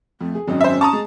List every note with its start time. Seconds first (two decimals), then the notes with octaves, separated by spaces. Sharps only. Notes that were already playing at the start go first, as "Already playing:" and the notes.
0.21 F2 A3
0.35 G#4
0.48 G#1 F#2 C#4 D#5
0.61 C5 E5
0.81 A5 A#5 C#6 D#6
0.93 G#3